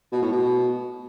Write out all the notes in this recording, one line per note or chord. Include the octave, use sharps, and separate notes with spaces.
B2
A2
B2